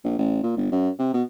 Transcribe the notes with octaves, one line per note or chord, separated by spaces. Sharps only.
A#1
A1
A#2
G1
F#2
C3
B2